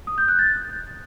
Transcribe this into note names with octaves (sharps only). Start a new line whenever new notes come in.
D#6
G6
F#6
A6